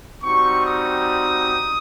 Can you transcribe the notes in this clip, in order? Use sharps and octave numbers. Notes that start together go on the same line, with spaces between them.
G3 C4 D#4 F#4 C#6
D#6